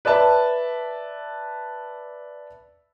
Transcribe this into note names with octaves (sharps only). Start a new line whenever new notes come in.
B4 D5 E5 A5